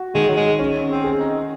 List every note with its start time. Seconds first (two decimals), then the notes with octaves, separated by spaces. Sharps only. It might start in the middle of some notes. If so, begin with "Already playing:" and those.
Already playing: F#4
0.15 D#3 G#3
0.28 F#3
0.37 G#3
0.59 C#4
0.90 C4
1.04 G#4
1.19 D#4